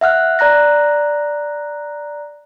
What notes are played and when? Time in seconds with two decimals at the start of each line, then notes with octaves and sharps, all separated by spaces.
0.01 E5 F#5 F6 F#6
0.39 D5 A#5 F#6 A#6